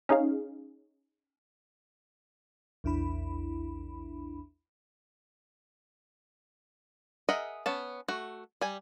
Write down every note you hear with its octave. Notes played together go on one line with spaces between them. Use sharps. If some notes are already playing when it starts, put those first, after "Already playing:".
C#4 D#4 G#4 F5
A#1 E2 D4 E4 B5
G#4 A#4 D#5 E5 F#5
B3 C#4 A5
A3 F#4
G3 G#5